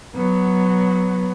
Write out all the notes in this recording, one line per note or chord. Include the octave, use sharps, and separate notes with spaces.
F#3 B3